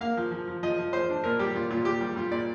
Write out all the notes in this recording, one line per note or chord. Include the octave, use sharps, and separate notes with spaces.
A#3 F5
F3
F3
F3
F3 D#5
F3
F3 C5
D4
A#2 A#4
G3 G4
A#2 F4
A#2 F4
A#2 G4
G3
G3 F4
A#2 D5